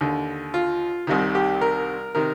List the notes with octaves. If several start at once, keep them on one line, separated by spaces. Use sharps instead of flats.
D#2 D3
F4
C2 C3 D#3
G4
A#4
C3 D#3 A#4